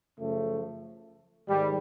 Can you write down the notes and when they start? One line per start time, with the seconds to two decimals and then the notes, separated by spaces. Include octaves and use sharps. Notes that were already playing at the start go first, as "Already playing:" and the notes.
0.19 F#2 C#3 F3 A3
1.47 G#2 D#3 G3